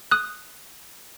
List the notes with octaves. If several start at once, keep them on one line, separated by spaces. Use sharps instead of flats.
D#6 F#6